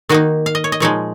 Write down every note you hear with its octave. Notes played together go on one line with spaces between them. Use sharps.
D#3 A#3 D#4 F#4
F5
D#5
C#5
D#5
A#2 F3 G#3 D#4 C#5